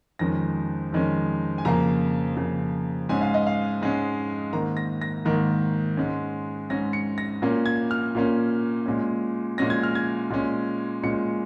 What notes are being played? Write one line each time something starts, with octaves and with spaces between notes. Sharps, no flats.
F2 D#3 G#3 C#4 A#6
F2 D#3 G#3 C#4
G#5
F2 C#3 A#3 A#5
F2 C#3 A#3
G#2 G#3 C#4 G#5
F5
D#5
F5
G#2 G#3 C#4
G#2 D#3 A#3 A#5
A#6
A#6
G#2 D#3 A#3
G#2 G#3 C#4
G#2 G#3 C#4 A#6
C#7
A#6
A#2 A#3 C#4
G#6
F6
A#2 A#3 C#4
A#2 G#3 C#4
A#2 G#3 C#4 A#6
G#6
F6
G#6
A#2 G#3 C#4
A#2 G#3 C#4 C#7